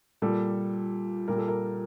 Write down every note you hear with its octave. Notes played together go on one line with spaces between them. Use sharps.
A#2 G3 A4
A#2 G3 A#4
A4
A#4